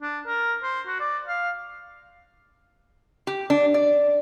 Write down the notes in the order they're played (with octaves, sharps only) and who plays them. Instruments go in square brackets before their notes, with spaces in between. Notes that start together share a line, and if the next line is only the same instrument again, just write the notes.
[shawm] D4
A#4
C5
F#4
D5
F5
[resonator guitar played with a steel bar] G4
D4
D5